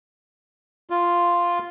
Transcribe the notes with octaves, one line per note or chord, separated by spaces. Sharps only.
F4